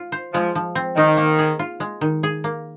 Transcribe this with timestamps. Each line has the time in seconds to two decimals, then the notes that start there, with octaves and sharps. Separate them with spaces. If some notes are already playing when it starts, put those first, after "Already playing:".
Already playing: F4
0.12 C5
0.34 F3 G#3
0.55 F3
0.75 C4
0.97 D#3 D#4
1.17 A#3
1.39 G#4
1.59 F4
1.80 G#3
2.01 D#3
2.23 G#4
2.44 A#3